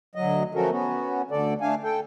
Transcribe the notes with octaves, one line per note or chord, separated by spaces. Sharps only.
D2 F#3 D#5
F3 A3 C#4 F#4 A4 A#4
B3 C#4 F#4
D2 D3 A4 D5
A3 D4 F5 G#5
A4 G5